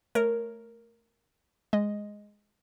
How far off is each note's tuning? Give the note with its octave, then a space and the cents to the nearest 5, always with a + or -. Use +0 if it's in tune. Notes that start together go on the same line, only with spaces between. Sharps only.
A3 +0 A#4 +0 C#5 -5
G#3 +0 D#5 +0